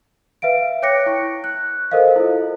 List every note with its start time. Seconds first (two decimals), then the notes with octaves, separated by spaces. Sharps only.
0.42 B4 E5 F5 D7
0.83 C#5 G5 D6 F#6 A#6 C#7
1.06 E4 C#6
1.44 F#6
1.91 A4 A#4 C5 D#5 F5
2.16 E4 F4 A4